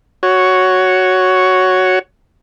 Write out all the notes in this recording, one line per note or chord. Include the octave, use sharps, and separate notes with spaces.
F#4 C#5